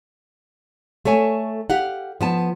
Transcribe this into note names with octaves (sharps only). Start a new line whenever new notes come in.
A3 A4 C#5 G#5
G4 F5 F#5
F3 B3 A5